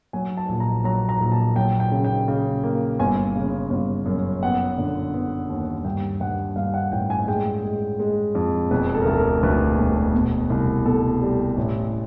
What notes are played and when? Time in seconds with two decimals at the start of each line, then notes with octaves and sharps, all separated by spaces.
0.13 F#3 G#5
0.37 A5
0.49 A#1
0.60 A#5
0.84 F#3 A#5
1.09 A#5
1.20 A#1
1.32 A5
1.56 F#3 G5
1.80 G5
1.92 C#3
2.04 G5
2.28 C#3
2.64 A#3
2.99 G1 G#5
3.35 C#3
3.70 G1
4.06 F#2
4.43 B3 F#5
4.78 D3
5.14 B3
5.49 D#2
5.84 G2 G5
6.20 G2 F#5
6.56 G2 F5
6.74 F#5
6.92 A1 G5
7.10 G#5
7.28 G#3 G5
7.64 G#3
7.99 G#3
8.35 F2
8.71 E1 B4
8.95 A4
9.02 A#4
9.06 D2 A4
9.18 A#4
9.43 D2 B4
9.78 E1
10.14 B2
10.50 C2
10.85 B2 A4
11.21 G3
11.57 A1